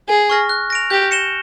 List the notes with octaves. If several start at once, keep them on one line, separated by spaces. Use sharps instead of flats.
G#4 G#5
C#6 F6 A#6
F#6
A#6 D7 F7
G4 G6
A#6 C#7 E7 G7